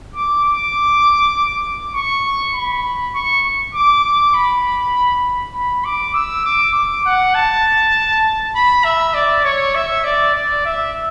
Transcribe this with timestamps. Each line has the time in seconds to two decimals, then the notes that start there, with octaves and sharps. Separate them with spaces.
0.15 D6
0.45 D6
1.94 C#6
2.54 B5
3.15 C#6
3.74 D6
4.04 D6
4.34 B5
5.54 B5
5.85 D6
6.14 E6
6.45 D6
6.74 D6
7.05 F#5
7.34 A5
8.55 B5
8.84 E5
9.14 D5
9.44 C#5
9.75 E5
10.04 D5
10.35 D5
10.65 E5